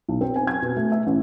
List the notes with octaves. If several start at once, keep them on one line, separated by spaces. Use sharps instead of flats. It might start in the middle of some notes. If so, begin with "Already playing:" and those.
B1
C4
G#5
G#6
B2
A3
E5
A1